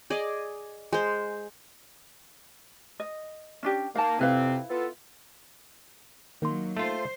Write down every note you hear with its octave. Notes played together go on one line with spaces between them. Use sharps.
G#4 D5 D#5
G#3 C5
D#5
C#4 D4 G4
A#3 D#4 F5 A5
F2 C3 C4 E4 B4 F5
B3 F4 A4
D#3 F#3 A#3 D#4 C6
A3 F4 C5